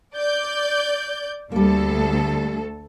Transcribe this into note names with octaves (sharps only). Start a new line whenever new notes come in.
D5 G6
D2 G3 A#3 A4